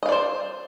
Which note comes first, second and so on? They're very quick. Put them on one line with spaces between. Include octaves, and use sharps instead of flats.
D#5 F5 D5 C5